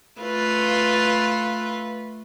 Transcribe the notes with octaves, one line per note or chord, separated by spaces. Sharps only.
A3 F4 B4